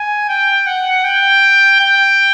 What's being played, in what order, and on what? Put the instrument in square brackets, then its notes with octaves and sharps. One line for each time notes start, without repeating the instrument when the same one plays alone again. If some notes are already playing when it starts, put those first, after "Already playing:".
Already playing: [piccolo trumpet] G#5
G5
F#5
G5
G5